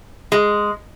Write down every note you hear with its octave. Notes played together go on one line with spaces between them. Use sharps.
G#3